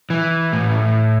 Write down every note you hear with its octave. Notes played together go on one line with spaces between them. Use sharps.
E3
A2